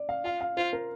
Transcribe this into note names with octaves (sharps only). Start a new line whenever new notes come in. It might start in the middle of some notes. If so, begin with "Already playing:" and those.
Already playing: D5
F5
F4 F5
F5
F4 C5
A#4